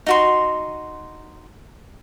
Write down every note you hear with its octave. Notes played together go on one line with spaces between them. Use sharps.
D#4 F#4 C6